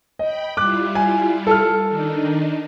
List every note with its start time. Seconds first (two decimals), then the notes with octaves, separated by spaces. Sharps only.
0.19 D#5 G5 B5
0.57 G3 E4 F4 D6 F#6
0.95 G#5
1.47 A4 F6
1.86 D#3 D4 D#4